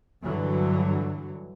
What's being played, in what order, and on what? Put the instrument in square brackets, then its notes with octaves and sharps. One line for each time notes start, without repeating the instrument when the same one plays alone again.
[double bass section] G2 D3 E3 F#3